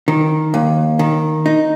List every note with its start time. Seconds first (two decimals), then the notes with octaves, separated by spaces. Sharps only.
0.08 D#3
0.54 D#2
0.99 D#3
1.46 D#4